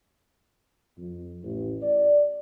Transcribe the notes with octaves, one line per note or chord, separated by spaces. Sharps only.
F2
A1
D5